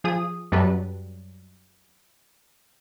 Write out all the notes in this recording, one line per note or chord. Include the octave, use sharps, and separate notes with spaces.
F3 G#4 D#6
F#2 F#3 G3 A4 B4